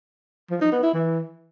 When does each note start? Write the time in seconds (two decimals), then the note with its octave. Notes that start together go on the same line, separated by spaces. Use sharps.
0.51 F3
0.61 D#4
0.72 B3
0.83 E4
0.94 E3